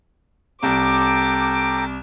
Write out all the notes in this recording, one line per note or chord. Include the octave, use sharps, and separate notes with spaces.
C2 A4 G5 A#5 D6